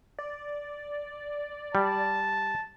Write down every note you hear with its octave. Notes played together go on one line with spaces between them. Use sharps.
D5
G3 A5